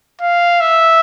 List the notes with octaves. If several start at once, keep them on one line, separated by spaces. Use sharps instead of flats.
F5
E5